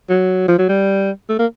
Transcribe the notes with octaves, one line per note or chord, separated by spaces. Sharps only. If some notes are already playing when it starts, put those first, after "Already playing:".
F#3
F3
F#3
G3
A3
A#3